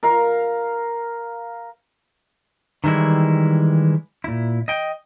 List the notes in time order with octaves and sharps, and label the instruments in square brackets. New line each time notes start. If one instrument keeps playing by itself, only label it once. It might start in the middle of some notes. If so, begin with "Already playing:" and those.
[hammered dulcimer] A#4 F5
[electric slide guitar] D#3 E3 G3 G#3 E4
A#2 E4
D#5 G5